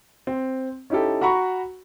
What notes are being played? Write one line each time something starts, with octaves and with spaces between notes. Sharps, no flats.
C4
C#4 D#4 E4 G4 A4
F#4 F#5 A#5 B5 C#6